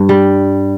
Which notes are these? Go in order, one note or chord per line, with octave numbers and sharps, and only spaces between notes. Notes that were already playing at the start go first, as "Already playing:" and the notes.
Already playing: G2
G3